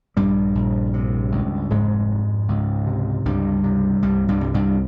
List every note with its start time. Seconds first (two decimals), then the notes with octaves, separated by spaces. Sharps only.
0.16 A#1 G2 G3
0.55 A#1
0.94 C3
1.32 C#2
1.70 F1 G#2 G#3
2.09 F2
2.48 C#2
2.87 C3
3.26 C#2 G2 G3
3.64 C3
4.02 C2 G2 G3
4.28 G2 G3
4.41 C2
4.54 G2 G3